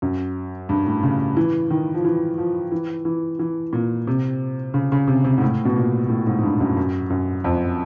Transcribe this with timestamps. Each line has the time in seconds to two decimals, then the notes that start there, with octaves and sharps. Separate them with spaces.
0.02 F#2
0.69 G2
0.86 A2
1.03 C#3
1.37 E3
1.70 D#3
1.94 F3
2.05 E3
2.38 F3
2.72 E3
3.05 E3
3.39 E3
3.73 A#2
4.07 C3
4.74 C#3
4.92 C#3
5.08 C3
5.24 C3
5.38 G#2
5.41 A2
5.65 B2
5.76 A#2
6.09 A2
6.26 G#2
6.38 G#2
6.43 G2
6.60 F#2
6.77 F#2
7.10 F#2
7.44 F2